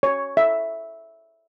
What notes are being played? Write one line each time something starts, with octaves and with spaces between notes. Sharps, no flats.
C#5
E5